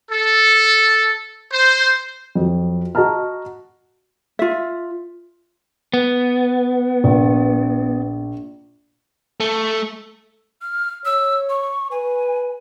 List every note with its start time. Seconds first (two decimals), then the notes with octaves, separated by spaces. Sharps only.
0.11 A4
1.52 C5
2.35 F2 F#3
2.95 F#4 D#5 A5 A#5 F6
4.39 F4 E5
5.94 B3
7.04 A#1
9.40 A3
10.62 F6
11.05 C#5 E6
11.50 C#6
11.91 B4 G#5